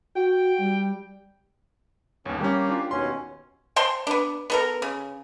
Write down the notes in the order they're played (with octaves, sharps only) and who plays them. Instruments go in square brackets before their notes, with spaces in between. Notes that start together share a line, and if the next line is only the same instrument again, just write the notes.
[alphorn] F#4 [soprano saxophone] G5
[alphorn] G3
[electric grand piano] G1 D#2 [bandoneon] C#4
[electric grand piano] G3 C#4 [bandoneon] A#3 G4
[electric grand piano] D4 F4
[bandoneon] D#2 B2 C#4 [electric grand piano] C6
[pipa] C5 G5 A5 C6
B3 D4
B3 A4 A#4
C#3